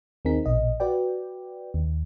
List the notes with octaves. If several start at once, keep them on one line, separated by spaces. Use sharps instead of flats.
D#2 C4 D#4 G#4 A#4 B6
A#1 B2 D#5
F#4 B4 D5 G5
D#2